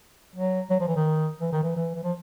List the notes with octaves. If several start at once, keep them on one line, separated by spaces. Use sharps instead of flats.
F#3
F#3
F3
E3
D#3
E3
D#3
E3
E3
E3
F3